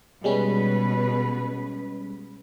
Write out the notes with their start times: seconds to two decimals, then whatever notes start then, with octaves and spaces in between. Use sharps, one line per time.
0.24 B2 G3 G#3 C#4 B4